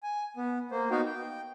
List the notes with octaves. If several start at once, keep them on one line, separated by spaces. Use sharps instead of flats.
G#5
B3
A#3 C5
B3 D#4 F#4 F5 G5
G5